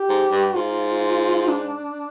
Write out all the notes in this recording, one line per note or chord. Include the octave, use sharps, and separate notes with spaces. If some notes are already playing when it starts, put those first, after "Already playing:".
Already playing: G4
G#2
G2
G#2 F4
D4